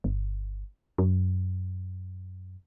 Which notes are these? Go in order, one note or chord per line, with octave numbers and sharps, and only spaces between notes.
G1
F#2